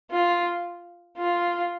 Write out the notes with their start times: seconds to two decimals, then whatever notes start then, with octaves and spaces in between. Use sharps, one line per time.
0.11 F4
1.17 F4